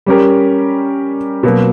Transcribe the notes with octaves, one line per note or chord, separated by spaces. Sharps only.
G3 C#4 G4 A#4
B2 F#3 A#3